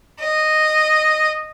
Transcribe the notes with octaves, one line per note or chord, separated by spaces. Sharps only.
D#5